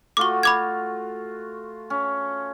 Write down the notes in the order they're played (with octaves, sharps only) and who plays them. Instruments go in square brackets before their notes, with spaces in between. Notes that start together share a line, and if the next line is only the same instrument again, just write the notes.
[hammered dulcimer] A3 F4 F#4 [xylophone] C#6 D6
[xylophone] B5 D6 G#6
[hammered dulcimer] C#4